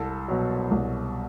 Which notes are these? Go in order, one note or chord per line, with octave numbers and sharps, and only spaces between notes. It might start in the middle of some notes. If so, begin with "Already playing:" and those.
Already playing: C2 A4
B2 F#3
C2